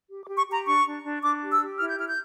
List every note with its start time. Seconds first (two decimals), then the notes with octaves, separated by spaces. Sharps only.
0.09 G4
0.23 D6
0.28 G4
0.38 C#6
0.47 G4 A#5
0.66 D4 C#6
0.85 D4
1.04 D4
1.22 D4 D6
1.42 G4
1.51 E6
1.61 G4
1.79 E4 F6
1.89 G6
1.98 E4 F6
2.08 G6